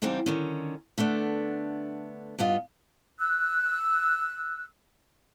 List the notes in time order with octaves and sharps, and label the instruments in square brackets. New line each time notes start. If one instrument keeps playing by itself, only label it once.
[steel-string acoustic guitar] E2 C#3 G3 C4 D4 D#4
D3 D#3 C#4
D3 A3 B3 D4
G2 B3 F4 D#5
[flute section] E6 F#6